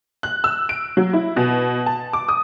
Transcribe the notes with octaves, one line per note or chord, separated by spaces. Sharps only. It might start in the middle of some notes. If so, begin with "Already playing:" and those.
F#6
E6
D7
F#3
E4
B2
A5
D6
D#6